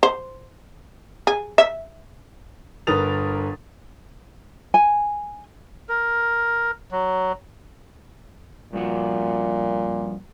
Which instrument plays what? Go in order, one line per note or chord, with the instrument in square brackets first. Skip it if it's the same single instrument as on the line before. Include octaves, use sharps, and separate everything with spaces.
[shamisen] C5
G#4
E5
[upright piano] G1 A#4 B4 D#6 A6 F7
[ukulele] G#5
[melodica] A#4
F#3
[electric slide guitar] G2 F3 F#4 [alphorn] A#2